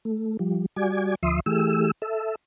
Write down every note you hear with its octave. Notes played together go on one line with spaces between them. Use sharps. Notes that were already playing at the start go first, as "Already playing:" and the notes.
A3
F3 G3
G3 F#4 D5 G#5
D2 F3 E5 C6 D#6
E3 A3 G4 G#4 E6
A4 E5